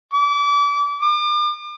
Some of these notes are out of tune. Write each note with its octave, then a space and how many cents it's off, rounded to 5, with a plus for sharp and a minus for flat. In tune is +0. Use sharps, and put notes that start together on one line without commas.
D6 -35
D6 +40